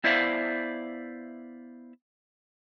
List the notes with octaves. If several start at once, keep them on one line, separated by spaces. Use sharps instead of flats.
B3 E4 C5 D5 E5 F5